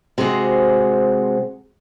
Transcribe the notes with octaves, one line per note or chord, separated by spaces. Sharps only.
C3 G#3 C4 F#4 G#4